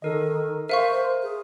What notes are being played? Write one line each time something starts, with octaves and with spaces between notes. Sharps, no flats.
D#3 A4 A#4 D#5
A#4 C5 E5 F5 C#6
G#4